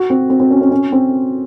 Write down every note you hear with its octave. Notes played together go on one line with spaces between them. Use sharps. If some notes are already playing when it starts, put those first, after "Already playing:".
Already playing: F#4
C4
C4
C4
C#4
C#4
C#4
C4